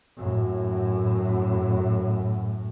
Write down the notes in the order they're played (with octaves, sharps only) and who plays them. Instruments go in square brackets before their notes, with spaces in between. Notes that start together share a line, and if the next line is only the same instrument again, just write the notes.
[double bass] F#2 A2